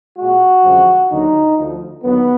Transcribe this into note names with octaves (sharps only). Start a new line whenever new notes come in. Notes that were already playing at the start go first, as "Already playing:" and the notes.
A#2 G#3 F#4
F#2 D3 F3 G#3
D#2 D3 F#3 D#4
D2 D3 F3
D#2 D3 F#3 B3